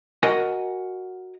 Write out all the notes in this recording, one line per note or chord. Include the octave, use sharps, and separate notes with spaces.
F#4 A#4 D#5 F#5 G#5